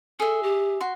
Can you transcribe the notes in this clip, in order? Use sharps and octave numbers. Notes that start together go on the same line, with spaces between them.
G#4 A4 E5
G4
F#4 C6